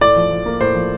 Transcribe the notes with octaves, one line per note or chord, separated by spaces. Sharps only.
A2 D5
F3
F3
A#3
A2 C5
F3